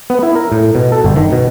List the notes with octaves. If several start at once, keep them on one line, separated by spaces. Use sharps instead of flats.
B3
E4
A#4
A2
B2
A4
G1
D#3
B2